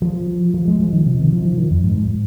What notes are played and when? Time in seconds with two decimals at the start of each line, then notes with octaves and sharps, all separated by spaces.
0.02 F3
0.54 F3
0.68 G#3
0.80 F3
0.93 D#3
1.06 C3
1.19 D#3
1.33 F3
1.45 F3
1.58 D#3
1.71 F2
1.83 G#2
1.97 G#2